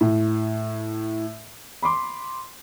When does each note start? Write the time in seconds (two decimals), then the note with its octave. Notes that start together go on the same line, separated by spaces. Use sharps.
0.01 A2
1.83 B5 C6 D6